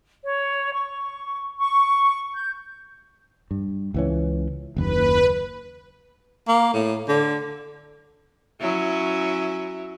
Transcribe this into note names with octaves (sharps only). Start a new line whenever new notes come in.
C#5
C#6
C#6
G6
G2
C#2 E3 C#4
F#1 D#2 B4
A#3
A2
D3
F#3 C#4 E4